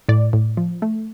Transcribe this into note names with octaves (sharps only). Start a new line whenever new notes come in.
A2 D5
A2
F3
A3